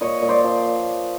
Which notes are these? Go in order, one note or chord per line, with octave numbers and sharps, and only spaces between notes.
A#2 C#5 D#5
A#2
C5 D5
F3